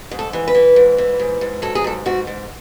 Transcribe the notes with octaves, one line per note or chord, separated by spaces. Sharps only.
G#2
A4
E3
B4
E3
G#2
E3
G#2
G#2
F#3 A4
G#4
G#2 A4
G#2 F#4
G#2